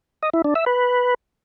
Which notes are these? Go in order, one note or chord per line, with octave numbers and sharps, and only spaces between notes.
D#5
E4
D4
E5
B4